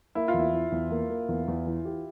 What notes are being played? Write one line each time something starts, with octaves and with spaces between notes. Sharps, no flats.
A#3 E4
F4
E2 E4
E3
E2
A#3
A#3
E2
E2
E3
G4